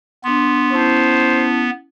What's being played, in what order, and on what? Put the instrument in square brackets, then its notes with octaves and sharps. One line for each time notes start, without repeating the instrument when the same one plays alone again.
[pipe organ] B3 [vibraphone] D4 C6
[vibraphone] C#4 E4 A5 [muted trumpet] C5